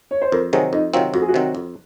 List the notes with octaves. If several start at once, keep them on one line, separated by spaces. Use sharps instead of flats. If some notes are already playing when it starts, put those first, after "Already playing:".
C#5
C5
F2 A#4
C3 D#3 F#3 C4 G#4
F2 D#4
C3 D#3 F#3 C4 F4
F2 F#4
G#4
F#4
C3 D#3 F#3 C4
F2